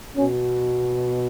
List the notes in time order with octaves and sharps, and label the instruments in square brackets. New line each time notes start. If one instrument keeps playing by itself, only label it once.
[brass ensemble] B2 C#4